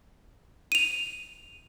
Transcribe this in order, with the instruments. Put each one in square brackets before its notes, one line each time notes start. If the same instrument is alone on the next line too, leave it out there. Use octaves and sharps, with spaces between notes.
[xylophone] D#7 F7